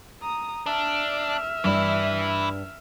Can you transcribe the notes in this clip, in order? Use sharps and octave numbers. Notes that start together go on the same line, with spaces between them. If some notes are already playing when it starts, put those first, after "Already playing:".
A#5 D#6
D4 E5 F6
G2 E3 D4 E4 D5